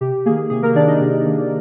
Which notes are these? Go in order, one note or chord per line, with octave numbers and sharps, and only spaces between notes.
C3 G4
D#3 A#3 G#4
C3 G#4
A#3 A#4
D#3 A#3 D4 D5
D#4 D#5
C3
D#3 A#3